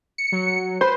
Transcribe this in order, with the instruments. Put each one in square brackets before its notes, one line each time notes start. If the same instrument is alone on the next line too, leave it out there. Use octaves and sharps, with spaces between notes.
[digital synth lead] C#7
[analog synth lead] F#3
[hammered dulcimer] B4 [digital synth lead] C5